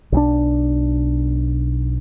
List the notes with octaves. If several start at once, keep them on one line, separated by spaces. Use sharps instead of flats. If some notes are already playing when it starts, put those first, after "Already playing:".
B1 F#3 D4